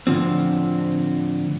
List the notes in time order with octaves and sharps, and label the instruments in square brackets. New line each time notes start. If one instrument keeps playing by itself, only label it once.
[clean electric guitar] A2 D3 F3 C4